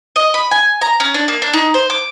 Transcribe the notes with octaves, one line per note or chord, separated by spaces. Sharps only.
D#5
B5
G#5
A#5
C#4
D4
A#3
D4
D#4
C5
D6